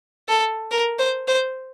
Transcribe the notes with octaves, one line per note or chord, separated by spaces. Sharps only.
A4
A#4
C5
C5